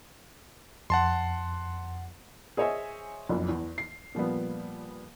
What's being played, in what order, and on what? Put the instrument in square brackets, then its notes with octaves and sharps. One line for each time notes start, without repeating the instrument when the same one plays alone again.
[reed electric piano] F2 [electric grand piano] F#5 A5 C6
[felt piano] G#4 C5 C#5 D#5 E5 G#5
F#1 B1 F2
E2
C7
A#2 F3 G3 B3